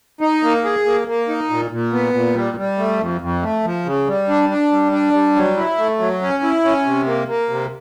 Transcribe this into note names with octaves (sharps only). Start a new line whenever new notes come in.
D#4
A#3
G#4
A#3
A#3
D#4
A#2
A#2
B3
A#2
G3
G3
A3
F2
F2
A3
F3
C#3
G3
D4
D4
G3
D4
G3
F#3
E4
A3
F#3
C#4
E4
C#4
C3
A#3
A#3
C3